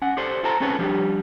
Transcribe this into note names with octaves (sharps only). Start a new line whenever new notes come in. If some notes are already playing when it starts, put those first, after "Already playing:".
C#4 F#5
G4 A4 C5 D5
F4 A4 C5 A5 A#5
C4 C#4 G#4 A4 B4 C#5
F3 G3 D4 G4